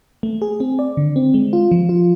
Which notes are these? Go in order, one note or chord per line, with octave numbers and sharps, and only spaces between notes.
A3
G#4
C4
D5
D3
C4
G#3
F4
F3
F4